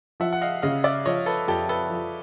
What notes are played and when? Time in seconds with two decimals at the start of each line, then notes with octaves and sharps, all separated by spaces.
0.20 F3 E5 F#5
0.33 F#5
0.41 D#5 F5
0.62 C#3 D#5 F5
0.84 D5 E5
1.05 F3 C#5 D#5
1.26 A4 B4
1.48 F2 G4 A4
1.69 A4 B4
1.90 F3